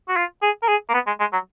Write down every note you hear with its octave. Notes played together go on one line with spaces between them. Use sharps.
F#4
F4
G#4
A#4
G#4
A#3
B3
G#3
G#3
F#3